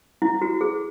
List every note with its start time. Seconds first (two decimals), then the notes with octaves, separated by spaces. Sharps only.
0.22 E4
0.42 F#4
0.61 G#4